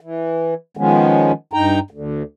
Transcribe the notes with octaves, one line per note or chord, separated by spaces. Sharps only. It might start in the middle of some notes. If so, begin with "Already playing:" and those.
E3
D#3 F3 G#3 B3 C#4
G2 D#4 G5 A#5
D2